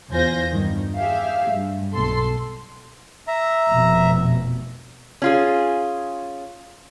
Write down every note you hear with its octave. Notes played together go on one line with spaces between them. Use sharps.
E2 F4 C5 G#5 G6 A#6
G2 D#3
G4 G#4 E5 F5
G2
B1 B2 A4 C6
E5 A#5
F1 B2
C#4 F4 G#4